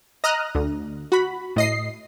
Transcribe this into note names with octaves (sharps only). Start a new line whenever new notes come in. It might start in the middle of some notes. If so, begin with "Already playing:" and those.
D#5 A#5 D#6 F6 F#6
D2
F#4 B5
A2 D#5 C7